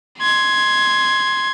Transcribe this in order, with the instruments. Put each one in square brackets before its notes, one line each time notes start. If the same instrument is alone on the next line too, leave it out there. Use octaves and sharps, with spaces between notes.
[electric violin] C6 G#6